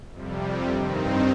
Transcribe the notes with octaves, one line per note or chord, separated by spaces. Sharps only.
F2 C3 G3
G2 D#3 C4 D#4